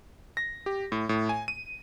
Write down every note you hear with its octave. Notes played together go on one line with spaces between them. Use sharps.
A#6
G4
A2
A2
G#5
D#7